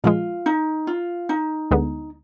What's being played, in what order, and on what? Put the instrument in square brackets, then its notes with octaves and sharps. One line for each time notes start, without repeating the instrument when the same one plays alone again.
[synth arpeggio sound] A#2 F3 G#3 [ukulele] F4
[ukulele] D#4
F4
D#4
[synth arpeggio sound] D2 D3 G#3 B3